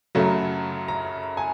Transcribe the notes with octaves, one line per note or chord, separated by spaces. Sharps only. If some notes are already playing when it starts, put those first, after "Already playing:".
F#2 C#3 F#3 A3 A#5
A#5
G#5